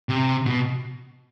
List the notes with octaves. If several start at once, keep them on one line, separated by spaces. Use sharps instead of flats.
C3
B2